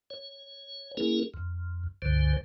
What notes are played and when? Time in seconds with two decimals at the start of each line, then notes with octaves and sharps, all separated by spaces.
0.10 C#5
0.97 A#3 C#4 E4 G#4 A#4
1.34 F2
2.02 C#2 G2 D3 C5